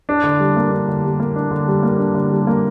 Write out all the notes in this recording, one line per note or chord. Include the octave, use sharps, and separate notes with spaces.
D4
D3
G3
A#3
D4
D3
G3
A#3
D4
D3
G3
A#3
D4
D3
G3
A#3